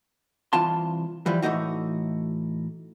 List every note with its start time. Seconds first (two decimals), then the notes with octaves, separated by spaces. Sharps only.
0.53 C2 E3 F4 A5 C6
1.26 E3 F3 G3
1.42 A2 E3 A3 D#4 F#4